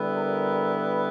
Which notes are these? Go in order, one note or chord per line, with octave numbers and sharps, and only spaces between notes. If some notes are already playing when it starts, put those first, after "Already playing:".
Already playing: D3 G3 B3 E4
A#4
B4